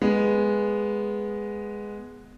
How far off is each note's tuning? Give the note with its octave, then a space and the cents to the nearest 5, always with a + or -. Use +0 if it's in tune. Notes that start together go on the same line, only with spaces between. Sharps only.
G#3 +0 B3 +0